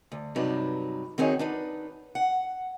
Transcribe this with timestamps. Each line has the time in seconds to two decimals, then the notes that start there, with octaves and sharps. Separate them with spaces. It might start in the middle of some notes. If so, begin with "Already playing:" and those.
0.12 D2
0.36 G2 C3 F#3 D#4 B4 A5
1.18 D#3 C4 D#4 F#4 G#4 C#5
1.39 D4 D#4 B4
2.15 F#5